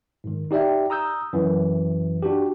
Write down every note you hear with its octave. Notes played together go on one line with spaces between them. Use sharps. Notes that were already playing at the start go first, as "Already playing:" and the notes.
G#2 D#3
D#4 G4 D5 E5 G5
A#5 D#6 E6 G6
F#2 E3
D4 F#4 G4